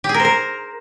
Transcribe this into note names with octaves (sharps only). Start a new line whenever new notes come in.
G4
G#4
A#4
C5
A#4